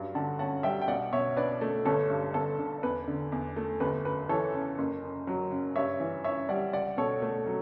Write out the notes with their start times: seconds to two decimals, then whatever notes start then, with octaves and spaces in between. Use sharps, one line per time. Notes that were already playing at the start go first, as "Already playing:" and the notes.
Already playing: G2 F#3
0.15 D3 F#5 A5
0.39 C#4 F#5 A5
0.63 G3 E5 G5
0.81 G5
0.88 B1 D5 F#5
1.13 B2 C#5 E5
1.37 D4 B4 D5
1.61 A3
1.85 G1 A4 C#5
2.10 G2
2.34 G1 A4
2.59 D3
2.83 E2 B4
3.08 D3
3.32 E2
3.56 A3
3.80 G1 B4
4.05 F#2 B4
4.29 E3 A4 C#5
4.54 C#3
4.78 F#1
5.03 F#2
5.27 F#3
5.51 C#3
5.75 G2 C#5 E5
6.00 E3
6.24 C#4 C#5 E5
6.49 G3 D5 F#5
6.73 C#2 D5 F#5
6.97 B2 A4 C#5
7.22 A3
7.46 F#3